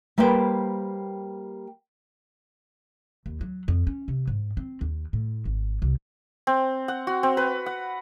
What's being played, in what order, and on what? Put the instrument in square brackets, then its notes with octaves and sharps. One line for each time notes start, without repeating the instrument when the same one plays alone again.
[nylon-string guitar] G3 A#3 B4 C5 G5
[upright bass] D#2
F#3
F2
C#4
C3
G#2
C4
D#2
A2
G#1
C2
[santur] C4
F#5
F#4
C4
B4
F#5